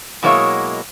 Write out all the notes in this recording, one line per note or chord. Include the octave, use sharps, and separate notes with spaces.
B2 F#3 G#3 A#3 E4 C#5